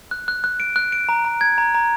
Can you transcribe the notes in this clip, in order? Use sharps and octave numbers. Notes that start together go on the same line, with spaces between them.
F#6
F#6
F#6
D7
F#6
D7
A#5
A#5
G#6
A#5
A#5